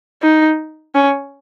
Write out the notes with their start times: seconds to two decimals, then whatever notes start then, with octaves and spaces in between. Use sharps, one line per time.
0.22 D#4
0.95 C#4